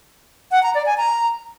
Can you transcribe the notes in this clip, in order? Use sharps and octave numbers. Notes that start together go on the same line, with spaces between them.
F#5
A#5
D5
G#5
A#5